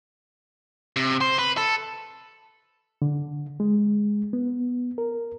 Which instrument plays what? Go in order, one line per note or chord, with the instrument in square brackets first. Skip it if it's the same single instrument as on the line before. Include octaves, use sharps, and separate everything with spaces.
[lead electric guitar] C3
C5
B4
A4
[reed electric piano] D3
G#3
B3
A#4